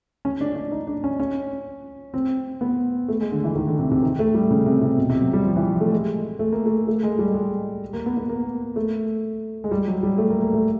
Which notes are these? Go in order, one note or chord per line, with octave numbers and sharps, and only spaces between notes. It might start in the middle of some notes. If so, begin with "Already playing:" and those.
C#4
D4
D4
D#4
D4
C#4
C#4
C4
B3
A3
G#3
D3
E3
D#3
D3
C3
C3
D#3
A3
G3
C#3
C3
C3
B2
C3
F#3
G3
F3
E3
F3
A3
G#3
A3
A#3
A3
A3
G#3
G3
G#3
A#3
B3
B3
A#3
A3
G#3
G3
F#3
G3
A3
A#3
A#3
A3